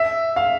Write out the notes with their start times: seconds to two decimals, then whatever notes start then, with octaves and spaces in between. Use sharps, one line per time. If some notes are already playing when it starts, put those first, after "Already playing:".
Already playing: E5
0.36 F5